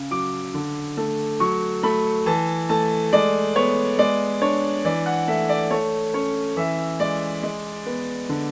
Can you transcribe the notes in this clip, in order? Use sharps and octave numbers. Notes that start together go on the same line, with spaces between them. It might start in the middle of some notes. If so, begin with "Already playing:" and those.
Already playing: C#3
F#3 D6
D3
A3
F#3 C#6
A3 B5
E3 A5
A3 A5
G#3 D5
B3 C#5
G#3 D5
D4 C#5
E3 D5
F#5
A3 E5
D5
A3 C#5
C#4 C#5
E3 E5
G#3 D5
G#3
B3
D3